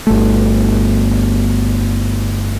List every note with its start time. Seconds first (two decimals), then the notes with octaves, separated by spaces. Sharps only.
0.07 G1 A3